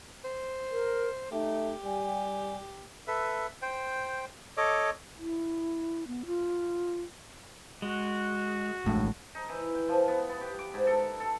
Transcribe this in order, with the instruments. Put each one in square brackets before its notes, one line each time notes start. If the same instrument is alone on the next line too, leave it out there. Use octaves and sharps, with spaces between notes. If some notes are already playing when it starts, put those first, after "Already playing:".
[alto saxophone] C5
[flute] A#4
[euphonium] A3 [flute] D#4 [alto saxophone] G4
[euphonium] G3 [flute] G#5
[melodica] A4 B4 E5
C5 G5
A4 C#5 D#5 D6
[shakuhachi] E4
B3
F4
[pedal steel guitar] G#3 [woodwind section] F#4
[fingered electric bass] A1 G#3 D4 [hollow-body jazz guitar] A2
[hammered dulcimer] D#4
E3
G5
F3
B3
B3
G4
D6
G#2
A4
A4